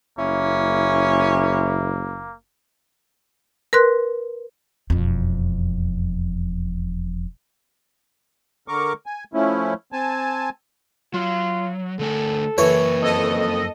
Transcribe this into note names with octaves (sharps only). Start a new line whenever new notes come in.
F#1 A#3 C#4 E4
A#4 B4 C6 F#6
E1 F2
D3 A#4 C#6 D6
G#5
F3 A3 C#4 E4
C4 G#5 A5
F#3 F4
D3 A3 A4 G#5
F#2 E3 A#3 C#5
F2 A4 D#5